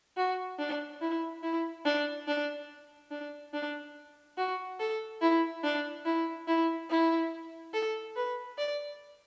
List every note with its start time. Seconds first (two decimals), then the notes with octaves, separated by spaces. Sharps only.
0.17 F#4
0.59 D4
1.01 E4
1.43 E4
1.85 D4
2.28 D4
3.11 D4
3.54 D4
4.38 F#4
4.80 A4
5.22 E4
5.64 D4
6.05 E4
6.48 E4
6.90 E4
7.74 A4
8.16 B4
8.58 D5